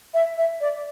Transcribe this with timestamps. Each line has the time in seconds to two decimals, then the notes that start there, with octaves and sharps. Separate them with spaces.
0.14 E5
0.38 E5
0.61 D5